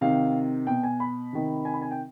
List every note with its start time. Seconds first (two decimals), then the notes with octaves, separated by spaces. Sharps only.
0.01 C3 D#3 F5
0.67 B2 G5
0.83 G#5
1.00 B5
1.33 C3 D#3
1.65 G#5
1.74 B5
1.82 G#5
1.91 G5